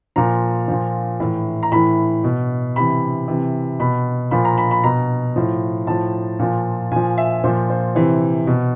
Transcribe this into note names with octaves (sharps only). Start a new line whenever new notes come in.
A#2 F3 A#5
A#2 F3
A2 E3
A#5
A2 E3 B5
B2
C3 E3 B5
C3 E3
B2 B5
A#2 F3 B5
A#5
B5
B5
B2 A#5
A2 F3
A2 F3 A5
A#2 F3
A#2 F3 G#5
E5
A#2 F3 C5
C5
C3 E3 C5
B2